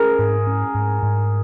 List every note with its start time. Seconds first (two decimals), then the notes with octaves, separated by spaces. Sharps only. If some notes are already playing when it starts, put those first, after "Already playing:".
Already playing: C#4 G#4 A#4
0.19 G#2
0.47 C#4
0.75 G#2
1.03 G#2